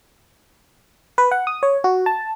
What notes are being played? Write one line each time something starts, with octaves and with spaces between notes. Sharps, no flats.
B4
F#5
D#6
C#5
F#4
A5